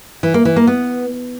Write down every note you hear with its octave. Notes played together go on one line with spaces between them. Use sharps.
E3
A#3
E3
A#3
B3